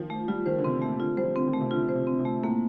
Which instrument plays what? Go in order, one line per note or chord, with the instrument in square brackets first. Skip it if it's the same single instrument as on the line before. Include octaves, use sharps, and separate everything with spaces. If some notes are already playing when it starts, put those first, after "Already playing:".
Already playing: [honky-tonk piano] D#3 F3
[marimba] A3
[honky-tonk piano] G3 [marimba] F4
[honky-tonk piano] D#3 [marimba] C5
[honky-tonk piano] D3
[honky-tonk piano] C3 [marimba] C4
[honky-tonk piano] A#2 [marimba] A3
[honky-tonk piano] D3 [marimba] F4
[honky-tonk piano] G3 [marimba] C5
[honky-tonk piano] F3
[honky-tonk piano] D3 [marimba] C4
[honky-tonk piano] D#3
[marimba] A3
[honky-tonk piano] C3
[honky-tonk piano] D3 [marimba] F4
[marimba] C5
[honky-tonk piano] C3
[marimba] C4
[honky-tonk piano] C3
[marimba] A3
[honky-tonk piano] A2 [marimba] A#3